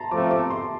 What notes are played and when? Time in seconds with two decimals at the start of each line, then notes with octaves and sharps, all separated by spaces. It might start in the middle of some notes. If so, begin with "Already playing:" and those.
Already playing: A5 A#5 C6
0.11 F3 A3 C4 D6
0.31 D6
0.50 C6